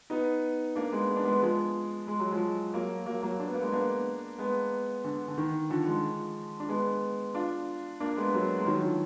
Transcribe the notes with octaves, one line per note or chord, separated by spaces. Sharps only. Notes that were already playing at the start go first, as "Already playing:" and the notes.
B3 D#4
A#3 D4
G#3 B3
B3
D4
G#3 B3
F3 G#3
G#3
F#3
F3 G#3
F#3 A#3
F#3 A#3
F#3 A#3
D4
B3
A#3
G#3 B3
A#3 D4
G#3 B3
D3
D3
D#3
D3 F3
F3 G#3
D4
G#3 B3
D4 F4
A#3 D4
G#3 B3
F#3 A#3
G#3
D#3 F#3
F#3
D3 F3